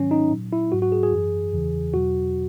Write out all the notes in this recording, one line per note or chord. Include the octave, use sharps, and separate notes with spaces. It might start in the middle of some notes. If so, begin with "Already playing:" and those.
Already playing: G#2 D#3 F#3 C#4
D#4
A#2 F#3
E4
G#2 F#3 F#4
F#4
G#4
G#4
F#2 E3
E2 C#3 E3
E2 B2 F#3 F#4